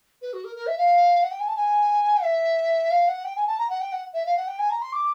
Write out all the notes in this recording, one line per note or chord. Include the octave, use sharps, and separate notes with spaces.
B4
F#4
A#4
A#4
E5
F5
F#5
G5
G#5
A5
G#5
E5
F5
F#5
G5
G#5
A5
A#5
F#5
G5
F#5
E5
F5
F#5
G5
G#5
A#5
C6
D6